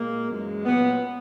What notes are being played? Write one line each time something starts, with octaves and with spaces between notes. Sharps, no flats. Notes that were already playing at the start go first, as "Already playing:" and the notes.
Already playing: A#2 G#3 A#3
F#2 E3 G#3
A#2 F#3 B3